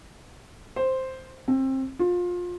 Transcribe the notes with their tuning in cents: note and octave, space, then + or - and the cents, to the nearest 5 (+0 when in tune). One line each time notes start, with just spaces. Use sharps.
C5 +0
C4 +25
F4 +25